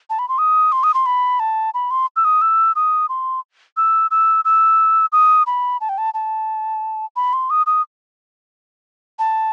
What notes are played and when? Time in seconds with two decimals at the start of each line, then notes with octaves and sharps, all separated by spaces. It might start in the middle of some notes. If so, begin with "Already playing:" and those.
0.10 A5
0.19 B5
0.29 C6
0.38 D#6
0.72 C6
0.84 D#6
0.94 C6
1.06 B5
1.40 A5
1.74 B5
1.91 C6
2.16 E6
2.25 D#6
2.42 E6
2.76 D#6
3.09 C6
3.77 E6
4.11 E6
4.45 E6
5.12 D#6
5.47 B5
5.81 A5
5.89 G5
5.98 A5
6.14 A5
7.16 B5
7.33 C6
7.50 D#6
7.66 D#6
9.19 A5